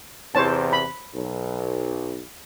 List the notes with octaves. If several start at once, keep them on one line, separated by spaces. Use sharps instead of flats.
E2 C3 C5 C#5 A5
B5
B1